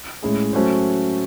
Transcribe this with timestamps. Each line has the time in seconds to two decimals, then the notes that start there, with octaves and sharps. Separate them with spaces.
0.23 A2 G#3 C#4 E4 G#4
0.53 F#3 A3 C#4 F#4 C5